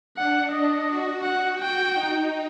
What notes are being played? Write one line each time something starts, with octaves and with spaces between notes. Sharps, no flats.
D4 F#5
D#5
F#4
F#4 F#5
G5
D#4